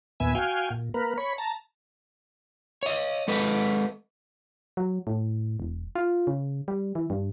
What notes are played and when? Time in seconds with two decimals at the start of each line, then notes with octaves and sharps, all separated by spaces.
0.20 D#2 A#2 B3 E5 G#5
0.35 F#4 F5 G5 G#5
0.70 A#2
0.94 A#3 A#4 B4
1.18 C#5 B5
1.38 A5 A#5
2.83 C#5 D#5
3.28 G#3 A4 B4 D#5
4.77 F#3
5.07 A2
5.60 E1
5.95 F4
6.27 C#3
6.68 G3
6.95 E3
7.10 G2